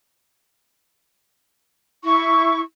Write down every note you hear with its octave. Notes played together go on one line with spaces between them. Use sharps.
E4 C#6